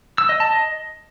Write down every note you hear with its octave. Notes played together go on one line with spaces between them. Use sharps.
E6
D#5
A5
D#5